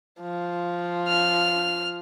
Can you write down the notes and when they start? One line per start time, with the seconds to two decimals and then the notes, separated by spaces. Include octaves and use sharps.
0.21 F3
1.08 F6